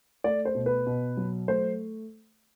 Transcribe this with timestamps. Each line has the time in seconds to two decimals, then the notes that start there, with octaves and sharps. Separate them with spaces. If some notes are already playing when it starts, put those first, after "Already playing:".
0.24 A3 D5
0.45 C5
0.55 B2
0.66 B4
0.86 B2
1.17 F#3
1.48 A3 C5